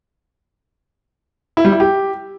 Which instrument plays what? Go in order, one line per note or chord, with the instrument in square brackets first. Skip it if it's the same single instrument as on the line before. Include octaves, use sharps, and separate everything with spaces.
[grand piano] E4
G3
E4
G4